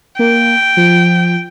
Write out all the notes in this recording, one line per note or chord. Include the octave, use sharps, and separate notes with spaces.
A#3 G5
F3